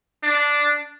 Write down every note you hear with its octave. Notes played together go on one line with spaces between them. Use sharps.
D4